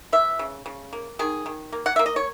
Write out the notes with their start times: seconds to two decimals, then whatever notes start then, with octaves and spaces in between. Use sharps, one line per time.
0.13 E3 E5
0.39 C#3
0.66 C#3
0.93 A#3
1.19 D#3 G#4
1.46 D#3
1.73 A#3
1.86 F#5
1.96 A#3 E5
2.06 D#5
2.16 C#5